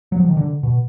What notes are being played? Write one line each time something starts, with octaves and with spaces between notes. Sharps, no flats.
F#3
F3
D#3
D3
B2